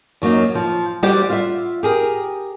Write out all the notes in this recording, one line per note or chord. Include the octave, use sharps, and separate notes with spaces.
F#2 F#3 A#3 D#4
F3
G3 F#4 G4 C5 D5
F4 E5
G4 G#4 A#4